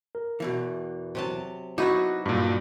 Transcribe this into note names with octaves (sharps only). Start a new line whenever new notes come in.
A#4
E2 B2 E3
C3 F#3 A5
F#3 B3 D#4 E4 F#4 F#5 B5 D6
G2 A#2